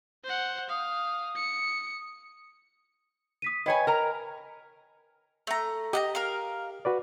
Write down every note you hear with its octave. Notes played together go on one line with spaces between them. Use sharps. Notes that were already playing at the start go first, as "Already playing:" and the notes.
C5 F#5
F5 D#6
C#7
D#6 B6 D#7
B4 C#5 D#5 G5 G#5 B5
A#4 A#5
A3 A#5
G4 D#5 F#5 A#5
A#4 F5
F#4 B4 D5